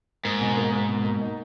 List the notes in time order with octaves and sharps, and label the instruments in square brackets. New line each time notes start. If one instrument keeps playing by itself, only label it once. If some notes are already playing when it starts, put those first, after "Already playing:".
[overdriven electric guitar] G#2 [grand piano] A#3
[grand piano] B2
A#3
A#3
B2
A#3
D#4